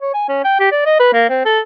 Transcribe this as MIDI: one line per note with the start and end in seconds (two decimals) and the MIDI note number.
0.02 0.13 73
0.14 0.27 80
0.29 0.42 61
0.44 0.58 79
0.60 0.71 67
0.72 0.81 74
0.86 1.00 75
1.00 1.09 71
1.13 1.25 58
1.30 1.41 60
1.45 1.60 69